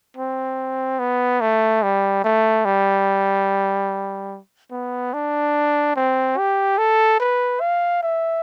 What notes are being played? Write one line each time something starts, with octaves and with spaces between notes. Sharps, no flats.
C4
B3
A3
G3
A3
G3
B3
D4
C4
G4
A4
B4
F5
E5